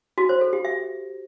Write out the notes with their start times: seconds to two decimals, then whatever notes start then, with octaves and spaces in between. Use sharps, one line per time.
0.18 F#4
0.29 C5
0.41 A4
0.53 G4
0.65 E5